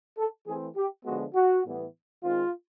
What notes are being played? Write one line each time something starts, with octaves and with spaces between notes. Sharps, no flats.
A4
E3 A3 C4 G#4
G4
D3 F3 G#3 B3 F#4
F#4
A2 E3 G3 B3
D#3 G#3 C4 F4